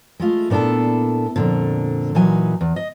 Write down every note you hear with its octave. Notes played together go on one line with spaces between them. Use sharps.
G#3 A3 F4
A#2 B3 D4 E4 A4
F2 A#2 D3
A#2 E3 F#3 D#4 B4 G#5
E2
D#5